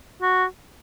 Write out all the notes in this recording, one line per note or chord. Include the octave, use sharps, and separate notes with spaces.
F#4